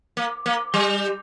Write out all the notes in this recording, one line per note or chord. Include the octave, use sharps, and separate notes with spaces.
A#3
A#3
G3